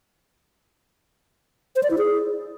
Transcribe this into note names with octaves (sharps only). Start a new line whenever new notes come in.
C5
D5
E4
G#4